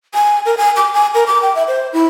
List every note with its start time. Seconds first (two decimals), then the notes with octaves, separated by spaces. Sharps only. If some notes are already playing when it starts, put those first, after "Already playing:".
0.14 G#5
0.46 A#4
0.57 G#5
0.76 D6
0.93 G#5
1.14 A#4
1.27 D6
1.42 G5
1.55 E5
1.68 C5
1.93 E4